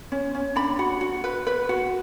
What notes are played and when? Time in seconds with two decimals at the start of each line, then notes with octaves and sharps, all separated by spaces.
0.12 C#4
0.35 C#4
0.56 D4 B5
0.79 F#4
1.01 F#4
1.24 B4
1.47 B4
1.69 F#4